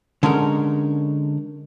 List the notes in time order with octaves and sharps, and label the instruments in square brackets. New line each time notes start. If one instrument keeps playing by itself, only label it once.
[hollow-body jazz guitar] D3 G#3 C#4 D#4 A#4